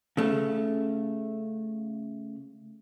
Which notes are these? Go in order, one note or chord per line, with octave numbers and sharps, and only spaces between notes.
C#3 A3